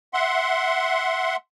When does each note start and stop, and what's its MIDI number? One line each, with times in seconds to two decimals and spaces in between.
0.14 1.36 76
0.14 1.36 78
0.14 1.36 84